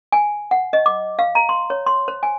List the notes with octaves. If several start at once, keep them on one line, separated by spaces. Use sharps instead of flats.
G#5
F#5
D#5
D6
F5
A#5
C6
C#5
C6
C5
G#5